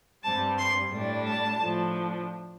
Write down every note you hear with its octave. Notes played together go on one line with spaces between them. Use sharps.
G2 G3 C4 A5
C6
A2 G3 D4
A5
A2 F3 D4